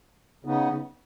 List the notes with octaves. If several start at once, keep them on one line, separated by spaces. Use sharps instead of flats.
C#3 B3 D#4